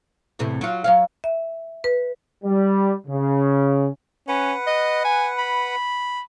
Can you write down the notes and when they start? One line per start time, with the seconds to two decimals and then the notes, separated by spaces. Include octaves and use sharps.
0.39 E2 A2 C3
0.61 F#3 F4
0.84 F#3 C#5 F5
1.24 E5
1.84 B4
2.44 G3
3.07 C#3
4.28 C#4 B4 F#5
4.67 D#5
5.05 G#5
5.38 B5